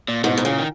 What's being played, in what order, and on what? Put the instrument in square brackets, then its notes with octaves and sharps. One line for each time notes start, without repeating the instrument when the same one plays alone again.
[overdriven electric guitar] A#2
[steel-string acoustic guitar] G#2 [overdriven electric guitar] B2
[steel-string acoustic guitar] G#2
[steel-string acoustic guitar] A#2 [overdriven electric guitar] C#3
[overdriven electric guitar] D#3